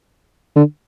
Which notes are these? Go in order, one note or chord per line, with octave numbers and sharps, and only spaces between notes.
D3